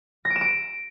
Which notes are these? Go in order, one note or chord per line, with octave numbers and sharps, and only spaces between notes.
A#6
D7
E7
D7